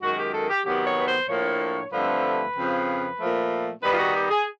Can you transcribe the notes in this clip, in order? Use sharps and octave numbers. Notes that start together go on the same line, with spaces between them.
F#2 D#3 G#3 F#4
G4
A4
G4
C3 D#3 F#3 B3 G4
C#5
B4
C5
A2 F3 A#3 D4 C#5
G2 D3 F3 A3 C4 B4
F2 C#3 F3
A#2 F3 A3
D#3 G3 B3 D#4 B4
F4
F#4
G4
G#4